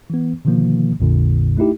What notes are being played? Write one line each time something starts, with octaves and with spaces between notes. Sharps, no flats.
E3 B3
B2 D3 D#3 F3 A#3
A#1 F2 A#2 D3
A3 D#4 E4 G4